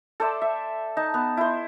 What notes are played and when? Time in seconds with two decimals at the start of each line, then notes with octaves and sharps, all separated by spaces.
0.20 A4 C5 D5 E5
0.42 E5
0.97 D#4 A5
1.14 B3
1.37 E4 C5